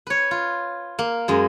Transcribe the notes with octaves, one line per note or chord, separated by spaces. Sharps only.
B4 C#5
F4
A#3
F#2 G#3